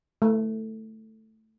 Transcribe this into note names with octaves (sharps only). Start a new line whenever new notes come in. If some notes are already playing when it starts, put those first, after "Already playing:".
A3